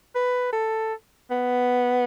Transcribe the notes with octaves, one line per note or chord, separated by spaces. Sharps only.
B4
A4
B3